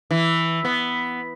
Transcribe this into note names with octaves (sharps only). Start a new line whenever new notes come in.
E3
B3